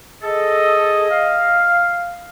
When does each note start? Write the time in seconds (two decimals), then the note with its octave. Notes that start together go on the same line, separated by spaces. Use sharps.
0.23 G#4 A4 D#5
1.10 F5